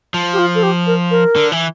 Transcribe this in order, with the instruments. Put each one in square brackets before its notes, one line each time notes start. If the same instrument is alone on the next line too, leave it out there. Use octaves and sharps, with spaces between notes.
[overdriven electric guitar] F3
[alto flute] G4
F4
A4
G4
A#4
A#4
[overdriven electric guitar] D3
E3